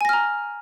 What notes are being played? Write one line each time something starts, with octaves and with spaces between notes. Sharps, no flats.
G#5 A#5 F6 A#6